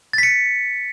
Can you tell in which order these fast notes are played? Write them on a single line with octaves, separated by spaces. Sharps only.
A6 B6 C#7